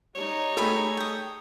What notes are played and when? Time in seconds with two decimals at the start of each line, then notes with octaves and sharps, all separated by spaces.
0.15 G3 D#4 C#5
0.57 A3 G#4 A4 G5 G#5 B5
0.97 G5 D#6